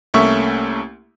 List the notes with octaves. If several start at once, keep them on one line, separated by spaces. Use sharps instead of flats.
C2 A3 A#3 C#4 E5 C#6